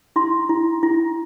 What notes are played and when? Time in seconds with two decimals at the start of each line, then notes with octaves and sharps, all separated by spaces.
0.16 E4 C6
0.49 E4
0.83 E4